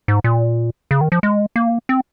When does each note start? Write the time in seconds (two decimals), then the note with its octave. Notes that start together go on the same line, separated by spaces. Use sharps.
0.08 G#2
0.24 A#2
0.91 C#3
1.01 D#3
1.12 F3
1.23 G#3
1.56 A#3
1.89 C4